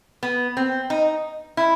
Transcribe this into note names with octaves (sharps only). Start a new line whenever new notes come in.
B3
C4
D#4
E4